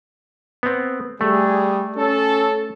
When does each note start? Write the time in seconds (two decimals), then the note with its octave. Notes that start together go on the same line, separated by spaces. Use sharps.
0.63 B3 C4
1.21 G3 A3 G#4
1.97 C#4 A4